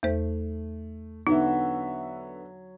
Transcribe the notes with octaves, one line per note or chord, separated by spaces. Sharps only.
E2 A3 C5
D3 F#3 B3 D#4 E5